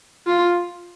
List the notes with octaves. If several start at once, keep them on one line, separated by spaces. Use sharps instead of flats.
F4